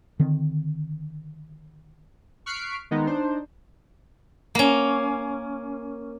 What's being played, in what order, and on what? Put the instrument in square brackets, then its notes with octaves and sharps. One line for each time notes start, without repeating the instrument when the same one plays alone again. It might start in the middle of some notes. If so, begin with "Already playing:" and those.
[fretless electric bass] D3 D#3 C4
[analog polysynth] C#6 F6 F#6 B6 C7 D7
D#3 G#3 B3 D#4
D4 D#4 C5
[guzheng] A#3 C#4